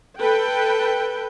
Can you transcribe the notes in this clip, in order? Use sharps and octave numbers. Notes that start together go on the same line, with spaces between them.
A4 B4 G5